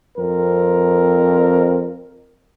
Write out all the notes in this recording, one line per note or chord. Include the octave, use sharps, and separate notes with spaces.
F2 C4 A#4